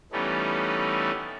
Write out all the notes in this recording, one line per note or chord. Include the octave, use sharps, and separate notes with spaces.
E3 G3 A3 B3 C#4 D#4